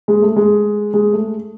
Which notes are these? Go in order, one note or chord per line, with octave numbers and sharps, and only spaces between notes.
G#3
A3
G#3
G#3
A3